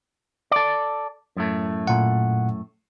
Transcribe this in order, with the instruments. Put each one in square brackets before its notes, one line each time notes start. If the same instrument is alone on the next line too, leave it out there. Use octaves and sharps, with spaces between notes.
[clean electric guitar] A4 D5
F#2 A2 A3
[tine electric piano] A#2 F#5